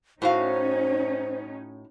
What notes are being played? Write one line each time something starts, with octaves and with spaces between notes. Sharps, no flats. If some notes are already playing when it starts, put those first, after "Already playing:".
A2 C#4 D#4 F#4 C5 F5